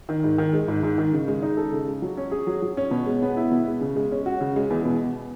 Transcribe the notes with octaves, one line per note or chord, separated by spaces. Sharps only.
D#3
G#2
D#3
G#3
G#2
G#2
D#3
C#3
G#3
D#4
A4
C#3
G#3
F#3
C#4
G#4
F#3
F#3
C#4
B2
G#3
B3
E4
B2
G#3
C#3
G#3
C#4
F#4
C#3
G#3
E2
B2